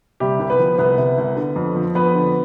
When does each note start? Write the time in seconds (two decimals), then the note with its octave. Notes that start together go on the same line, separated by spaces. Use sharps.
0.20 C3 G3 G4
0.39 C2
0.50 B3 B4
0.59 F3
0.78 C2 B3 B4
0.98 C3
1.18 C2
1.37 D3
1.56 F2
1.75 F3
1.95 F2 B3 B4
2.15 D3